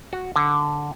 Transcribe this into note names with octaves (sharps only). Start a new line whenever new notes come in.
F#4
D3